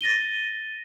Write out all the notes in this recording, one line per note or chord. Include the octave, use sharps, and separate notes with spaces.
A6 A#6 D#7 G7